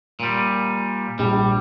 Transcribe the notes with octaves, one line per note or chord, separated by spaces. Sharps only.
A#2 G3
A#1 G3